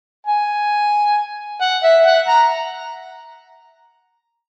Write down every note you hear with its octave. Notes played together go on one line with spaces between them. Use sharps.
G#5
F#5
E5
F#5
A#5